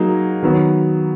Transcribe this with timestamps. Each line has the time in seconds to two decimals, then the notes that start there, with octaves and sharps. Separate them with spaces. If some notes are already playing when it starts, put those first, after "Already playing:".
Already playing: F#3 A#3 D#4 G#4
0.42 D#3 F#3 B3